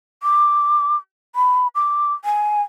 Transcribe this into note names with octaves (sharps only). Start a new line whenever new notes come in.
D6
B5
D6
G#5